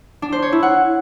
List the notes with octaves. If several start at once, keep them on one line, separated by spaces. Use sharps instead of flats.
D4
C5
C#5
E4
F#5